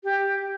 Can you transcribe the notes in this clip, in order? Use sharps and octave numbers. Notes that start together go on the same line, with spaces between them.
G4